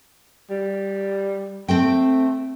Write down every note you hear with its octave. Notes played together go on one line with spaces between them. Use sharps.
G3
A3 C4 C5 G5